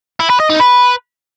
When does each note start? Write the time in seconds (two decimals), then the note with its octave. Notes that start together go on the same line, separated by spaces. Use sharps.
0.20 E4
0.30 B4
0.40 D#5
0.50 D#4
0.60 B4